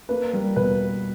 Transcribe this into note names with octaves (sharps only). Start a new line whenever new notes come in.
A#3 B4
G3 A#4
B2 B4